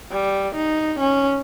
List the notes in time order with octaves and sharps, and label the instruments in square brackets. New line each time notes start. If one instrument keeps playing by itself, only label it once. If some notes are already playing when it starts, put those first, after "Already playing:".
[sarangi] G3
D#4
C#4